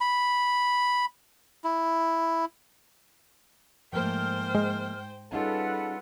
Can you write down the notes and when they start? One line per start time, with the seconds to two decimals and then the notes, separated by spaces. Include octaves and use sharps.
0.01 B5
1.64 E4
3.93 G#2 F3 A3 A#3 C5 G5 F6
4.55 G#3
5.32 G3 C#4 D#4 F4 G#4 A4 B4 F#5